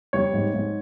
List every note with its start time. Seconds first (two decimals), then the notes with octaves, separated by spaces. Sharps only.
0.13 G3 C#5
0.33 G#2
0.54 G#2